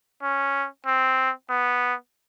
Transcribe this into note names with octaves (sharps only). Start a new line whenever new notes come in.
C#4
C4
B3